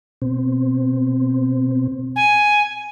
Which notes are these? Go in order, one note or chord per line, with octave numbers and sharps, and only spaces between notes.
B2 C4
G#5